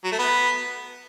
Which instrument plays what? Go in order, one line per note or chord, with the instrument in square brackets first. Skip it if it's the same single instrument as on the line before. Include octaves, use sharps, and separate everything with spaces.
[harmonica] F#3
A3
B3